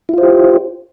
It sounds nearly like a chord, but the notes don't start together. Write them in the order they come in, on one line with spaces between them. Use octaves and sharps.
E4 F4 C5 G4